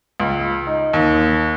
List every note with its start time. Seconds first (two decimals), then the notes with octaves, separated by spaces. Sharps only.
0.20 C#2
0.67 D#4
0.94 D#2